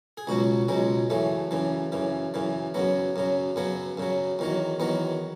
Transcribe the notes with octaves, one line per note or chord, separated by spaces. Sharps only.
G#4
C#2 B2 F#3 F#4
C#2 B2 F#3 G#3
F#2 C#3 E3 A3
F#2 C#3 E3
F#2 C#3 E3
F#2 C#3 E3
F#2 C#3 F#3 B3
F#2 C#3 F#3
F#2 C#3 F#3 B3
F#2 C#3 F#3
E2 D#3 F#3
E2 D#3 F#3 B3